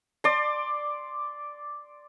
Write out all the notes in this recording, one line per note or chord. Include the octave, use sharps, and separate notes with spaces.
D5 C6